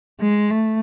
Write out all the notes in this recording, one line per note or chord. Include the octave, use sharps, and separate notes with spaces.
G#3
A3